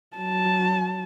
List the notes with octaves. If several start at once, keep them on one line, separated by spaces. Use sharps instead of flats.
F#3 A5